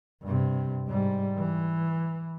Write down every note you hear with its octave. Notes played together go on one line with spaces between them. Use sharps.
G2 C3
G#2 G3
E3